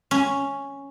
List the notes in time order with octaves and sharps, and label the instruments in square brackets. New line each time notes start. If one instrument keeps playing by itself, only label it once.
[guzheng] C#4